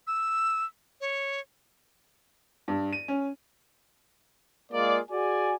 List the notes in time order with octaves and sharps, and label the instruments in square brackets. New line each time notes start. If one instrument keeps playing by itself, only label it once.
[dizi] E6
C#5
[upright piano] G2
D#7
C#4
[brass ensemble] G#3 A#3 F4 G#4 D5
F#4 G#4 D5 G#5